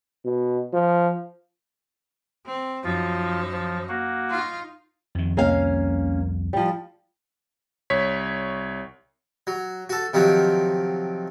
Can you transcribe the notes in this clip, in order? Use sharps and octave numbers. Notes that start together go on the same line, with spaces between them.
B2
F3
C4
F#2 F3 D#4 F4
F3
A#3 F#4
D#4 F4
F2 D#3
C2 F2 A#3 C#4 F5
F3 G3
C2 C#5 B6
F#3
F#4 A4
C3 D#3 F3 F#3